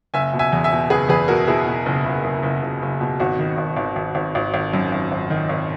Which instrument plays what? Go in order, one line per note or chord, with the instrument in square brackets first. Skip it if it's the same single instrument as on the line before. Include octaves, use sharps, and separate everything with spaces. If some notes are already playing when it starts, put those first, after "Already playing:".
[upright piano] F#1 E5 G#5
B2
E5 G#5
E2
E5 G#5
B2
F#1 G#4 B4
E2 G#4 B4
B2 F#4 A#4
B2 E4 G#4
B2
F#1
F#1
F#1
F#1
F#1
F#1
B2
G#1 F#4
D#3
G#1
G#1
G#1
G#1
G#1
G#1
F#2
G#1
G#1
D#3
G#1